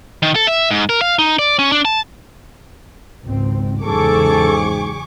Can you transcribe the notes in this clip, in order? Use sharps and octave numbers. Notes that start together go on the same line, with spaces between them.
D#3
A4
E5
G#2
A#4
F5
D#4
D5
C#4
D4
A5
G#1 C#2 C4
E2 G#2 C#3 F#3 G#4 A4 C#6 D6